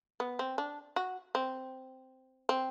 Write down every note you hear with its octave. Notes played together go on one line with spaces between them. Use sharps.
B3
C4
D4
F#4
C4
C4